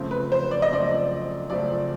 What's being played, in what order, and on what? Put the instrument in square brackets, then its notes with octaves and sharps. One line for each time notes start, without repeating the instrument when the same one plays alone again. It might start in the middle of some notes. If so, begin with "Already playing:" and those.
Already playing: [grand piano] F#2 C#3 F3 A3 C4
[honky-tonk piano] B4
C5
D5
D#5
[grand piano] F#2 C#3 F3 A3 C4 [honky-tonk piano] D5
[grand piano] F#2 C#3 F3 A3 C4 [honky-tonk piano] D5